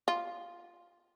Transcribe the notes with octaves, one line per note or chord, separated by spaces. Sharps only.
F4